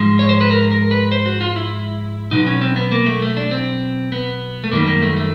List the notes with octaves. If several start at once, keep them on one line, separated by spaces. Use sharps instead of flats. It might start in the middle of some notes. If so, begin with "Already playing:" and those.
Already playing: G#2 F3 G#3
C#5
C5
B4
A#4
A#4
B4
C5
F#4
F4
E4
B2 F#3 D#4
C#4
C4
B3
A#3
A3
A3
D4
C4
B3
A3
F#2 D#3 G3 A#3
A#3
A3
A3